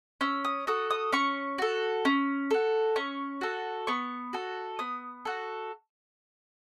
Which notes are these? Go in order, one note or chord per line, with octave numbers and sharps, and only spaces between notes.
C#4 E6
D#6
F#4 A4 D#6
D#6
C#4 C#6
F#4 A4
C#4
F#4 A4
C#4 C#6
F#4 A4
B3 C#6
F#4 A4
B3 D#6
F#4 A4